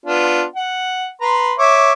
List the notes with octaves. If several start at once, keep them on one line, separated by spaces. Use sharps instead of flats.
B3 D4 F4
F#5
B4 A#5 C6
C#5 E5 D6